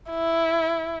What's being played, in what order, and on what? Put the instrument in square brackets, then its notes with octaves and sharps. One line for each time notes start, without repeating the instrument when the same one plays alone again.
[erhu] E4